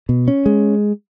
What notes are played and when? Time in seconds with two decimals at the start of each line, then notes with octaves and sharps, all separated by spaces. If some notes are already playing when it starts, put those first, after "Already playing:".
0.09 B2
0.28 C#4
0.46 G#3